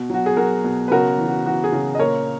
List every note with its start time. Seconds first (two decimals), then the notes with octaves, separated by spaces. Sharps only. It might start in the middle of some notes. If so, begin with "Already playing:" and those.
Already playing: B2
0.10 F#3 F#4
0.26 G#4
0.37 F#3 F#4 A#4
0.64 B2
0.88 B4
0.91 C#3 F#4 A#4
1.18 E3
1.28 F#4
1.46 E3 F#4
1.64 G#4
1.72 C#3
1.95 D#5
1.99 A#2 A#4 C#5